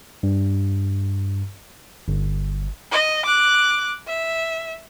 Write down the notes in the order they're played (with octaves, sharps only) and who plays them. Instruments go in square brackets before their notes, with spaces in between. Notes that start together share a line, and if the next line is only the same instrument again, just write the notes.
[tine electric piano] G2
G1
[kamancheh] D#5
D6 F#6
E5